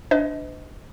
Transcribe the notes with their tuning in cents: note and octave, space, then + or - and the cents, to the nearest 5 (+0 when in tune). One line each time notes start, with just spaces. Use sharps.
D4 +0 C5 -45 D#5 +25